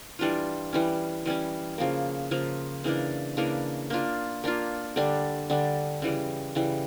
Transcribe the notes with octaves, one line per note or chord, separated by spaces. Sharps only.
E3 G3 D4 F4
E3 G3 C#4
E3 G3 C#4
C#3 F3 A#3
C#3 F3 A#3
C#3 E3 A#3 D4
C#3 E3 A#3 D4
A#3 D4 F4
A#3 D4 F4
D3 G3 D4
D3 G3 D4
C#3 E3 G3
C#3 E3 G3